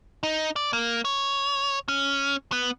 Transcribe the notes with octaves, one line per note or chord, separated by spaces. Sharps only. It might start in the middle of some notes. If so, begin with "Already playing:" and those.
D#4
D5
A#3
C#5
C#4
B3